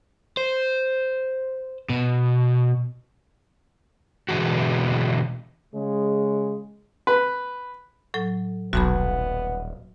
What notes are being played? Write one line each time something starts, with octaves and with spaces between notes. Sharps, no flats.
C5
B2
B2 D3 E3 G#3 F#4
C#3 G#3
B4
A2 F#3 A4
D#1 B1 B3 F#4 A5 B5